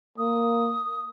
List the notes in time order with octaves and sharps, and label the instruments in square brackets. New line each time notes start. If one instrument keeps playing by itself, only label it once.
[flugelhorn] A#3 [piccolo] D#6